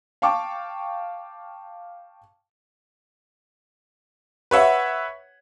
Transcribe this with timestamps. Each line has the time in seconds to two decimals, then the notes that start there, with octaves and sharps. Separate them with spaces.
0.22 F5 G5 A5 C#6 D6
4.51 B4 C#5 E5 F#5